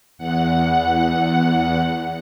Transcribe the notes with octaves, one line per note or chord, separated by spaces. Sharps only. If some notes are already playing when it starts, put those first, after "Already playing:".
E2 F#5